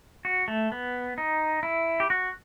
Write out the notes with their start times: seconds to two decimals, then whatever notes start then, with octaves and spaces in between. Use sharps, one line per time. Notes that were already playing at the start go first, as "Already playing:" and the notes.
0.25 F#4
0.48 A3
0.72 B3
1.18 D#4
1.63 E4
2.00 G4
2.10 F#4